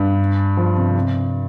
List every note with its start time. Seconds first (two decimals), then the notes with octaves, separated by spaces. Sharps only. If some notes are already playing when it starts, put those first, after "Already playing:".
Already playing: G2
0.57 F3
0.77 C3
0.95 C3